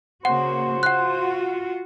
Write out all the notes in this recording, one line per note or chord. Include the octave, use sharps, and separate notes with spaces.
C#3 A#3 F#4 C5 F#5
F4 F#4 F#5 F#6